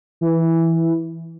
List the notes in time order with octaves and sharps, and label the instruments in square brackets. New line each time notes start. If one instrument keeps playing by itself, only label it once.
[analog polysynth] E3